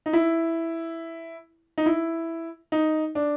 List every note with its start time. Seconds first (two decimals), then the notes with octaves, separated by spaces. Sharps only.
0.06 D#4
0.13 E4
1.78 D#4
1.86 E4
2.72 D#4
3.15 D4